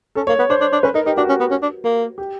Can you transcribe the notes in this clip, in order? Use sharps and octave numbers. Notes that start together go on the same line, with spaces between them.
C#4 A4
A#3 C#5
B3
D4 C5
D4
D4
C#4 B4
D#4 A#4
D#4 G4
D4 F#4
C#4
B3
C#4
D4
A#3
G4